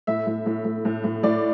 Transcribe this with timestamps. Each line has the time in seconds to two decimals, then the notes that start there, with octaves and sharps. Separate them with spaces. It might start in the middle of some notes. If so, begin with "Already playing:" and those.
0.07 A2 E5
0.27 A2
0.46 A2
0.65 A2
0.85 A2
1.04 A2
1.23 A2 D5